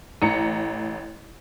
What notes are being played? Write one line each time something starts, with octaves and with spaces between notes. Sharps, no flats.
A1 A#5 C#7